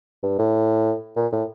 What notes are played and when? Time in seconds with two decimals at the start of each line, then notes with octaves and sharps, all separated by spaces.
0.23 G2
0.38 A2
1.16 A#2
1.32 A2